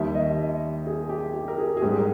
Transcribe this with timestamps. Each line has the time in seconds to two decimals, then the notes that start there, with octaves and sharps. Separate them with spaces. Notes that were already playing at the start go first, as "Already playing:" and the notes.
Already playing: D#2 D#3 G3 E5
0.15 D#5
0.87 G#4
1.09 G4
1.34 G4
1.48 A#4
1.58 G#4
1.77 G#4
1.81 G#2 G3 G4
1.98 A#4